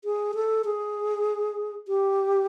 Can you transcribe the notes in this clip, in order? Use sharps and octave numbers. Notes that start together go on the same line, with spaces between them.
G#4
A4
G#4
G4